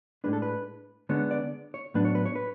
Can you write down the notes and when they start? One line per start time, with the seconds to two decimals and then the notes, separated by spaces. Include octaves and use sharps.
0.24 A2 G#3 D4 B4
0.33 A4
0.42 B4
1.09 D3 G#3 B3 D4 C#5
1.31 D5
1.74 C#5
1.94 A2 F#3 B3 D4 B4
2.05 C#5
2.15 B4
2.26 C#5
2.36 B4